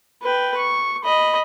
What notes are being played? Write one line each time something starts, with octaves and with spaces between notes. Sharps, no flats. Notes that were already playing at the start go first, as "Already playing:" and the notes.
B4 G5
C#6
D#5 B5